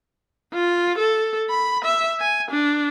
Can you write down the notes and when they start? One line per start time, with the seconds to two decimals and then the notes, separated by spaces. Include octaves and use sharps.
0.54 F4
0.98 A4
1.50 B5
1.84 E5
2.20 G#5
2.50 D4